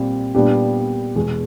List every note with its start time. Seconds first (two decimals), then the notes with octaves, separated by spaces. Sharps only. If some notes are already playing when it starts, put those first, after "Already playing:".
Already playing: A#2 G3 C4
0.35 A#2 G3 B3 D4 G4
1.15 E2 B2 G#3